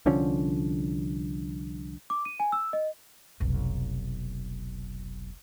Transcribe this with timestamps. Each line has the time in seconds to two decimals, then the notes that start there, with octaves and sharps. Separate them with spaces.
0.06 C2 D3 F3 C#4
2.10 D6
2.25 D#7
2.40 G#5
2.52 E6
2.73 D#5
3.40 F1 B1